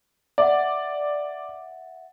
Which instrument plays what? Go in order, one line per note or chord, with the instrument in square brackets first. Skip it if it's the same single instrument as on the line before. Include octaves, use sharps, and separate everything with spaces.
[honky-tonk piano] D5 [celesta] E5 F#5